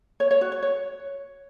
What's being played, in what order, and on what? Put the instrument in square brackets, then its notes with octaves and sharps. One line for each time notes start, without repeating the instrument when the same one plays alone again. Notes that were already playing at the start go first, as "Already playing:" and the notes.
[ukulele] C#5
C#5
F#4
C#5
C#5